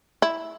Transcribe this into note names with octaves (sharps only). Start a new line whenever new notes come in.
E4